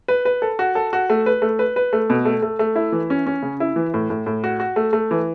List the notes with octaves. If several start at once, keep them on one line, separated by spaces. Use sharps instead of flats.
B4
B4
A4
F#4
A4
F#4
A3
B4
A3
B4
B4
A3
B2
A3
A3
A3
E4
E3
C#4
C#4
C#3
E4
E3
A2
A2
A2
F#4
F#4
A3
A3
E3